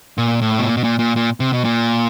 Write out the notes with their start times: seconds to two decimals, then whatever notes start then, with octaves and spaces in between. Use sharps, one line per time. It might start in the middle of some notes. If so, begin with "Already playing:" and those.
0.18 A#2
0.42 A2
0.59 B2
0.66 A#2
0.77 B2
0.84 A#2
0.99 A#2
1.16 A#2
1.40 C3
1.53 B2
1.64 A#2